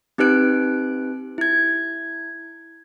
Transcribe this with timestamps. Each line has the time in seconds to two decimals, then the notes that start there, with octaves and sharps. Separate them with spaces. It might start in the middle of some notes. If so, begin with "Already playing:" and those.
0.18 C4 D#4 G4 B4 F#6 D7
1.38 E4 G#6